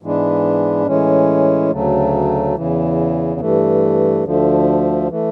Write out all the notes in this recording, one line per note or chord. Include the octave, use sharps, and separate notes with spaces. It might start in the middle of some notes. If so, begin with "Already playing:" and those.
G#2 E3 G#3 B3 D4
A2 E3 G#3 C#4
D2 C#3 F#3 A3
E2 C#3 E3
G2 E3 A3
D2 D3 F3 A3
E3 A3